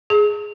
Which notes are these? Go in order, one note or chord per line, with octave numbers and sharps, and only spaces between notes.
G#4